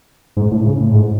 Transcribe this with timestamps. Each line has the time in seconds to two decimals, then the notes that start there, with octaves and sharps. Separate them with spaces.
0.37 G#2
0.51 A2
0.66 C#3
0.80 A2
0.91 G#2